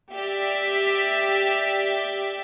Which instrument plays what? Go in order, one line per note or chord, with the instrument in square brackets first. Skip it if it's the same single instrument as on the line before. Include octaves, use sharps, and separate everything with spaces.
[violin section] G4 D5 E5